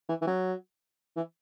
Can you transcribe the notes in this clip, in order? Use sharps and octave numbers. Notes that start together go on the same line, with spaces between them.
E3
E3
F#3
E3